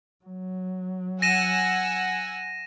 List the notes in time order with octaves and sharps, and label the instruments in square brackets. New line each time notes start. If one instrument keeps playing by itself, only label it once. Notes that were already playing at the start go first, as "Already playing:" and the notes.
[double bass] F#3
[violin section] F#5 G#5 E6 [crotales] A#6 D#7 E7